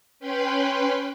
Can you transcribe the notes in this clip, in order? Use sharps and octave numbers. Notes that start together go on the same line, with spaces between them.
C#4 B4 G5 B5 C6